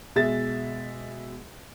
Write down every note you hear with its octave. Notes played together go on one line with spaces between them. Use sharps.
B2 G#3 G#4 E5 A6